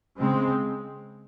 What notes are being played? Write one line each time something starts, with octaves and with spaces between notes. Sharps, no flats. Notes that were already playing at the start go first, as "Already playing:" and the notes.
C#3 G#3 C4